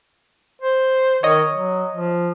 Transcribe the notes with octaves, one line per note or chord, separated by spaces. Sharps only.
C5
D#3 C#5 D#5
F#3
F3